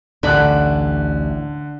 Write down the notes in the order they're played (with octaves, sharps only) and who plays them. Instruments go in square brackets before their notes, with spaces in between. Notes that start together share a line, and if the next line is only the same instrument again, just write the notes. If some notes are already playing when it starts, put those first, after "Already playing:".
[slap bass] A1 D2 A2 [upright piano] D3 F#6 [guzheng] D4 B5